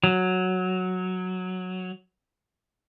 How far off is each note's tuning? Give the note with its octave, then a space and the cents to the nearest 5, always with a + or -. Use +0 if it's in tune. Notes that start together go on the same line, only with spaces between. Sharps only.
F#3 -5